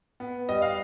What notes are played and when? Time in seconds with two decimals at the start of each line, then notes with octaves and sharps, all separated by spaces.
0.20 B3
0.49 G3 D#5
0.62 F5